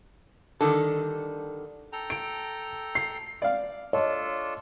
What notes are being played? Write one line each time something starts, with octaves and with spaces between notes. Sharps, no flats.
D3 D#3 G3 A4
A4 G5 A#5
D7
C7
D5 F5
D4 F4 A4 C#5 D#5